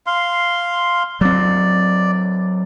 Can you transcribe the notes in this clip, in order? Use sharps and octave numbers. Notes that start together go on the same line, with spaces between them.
F5 C6
F#3 C4 D5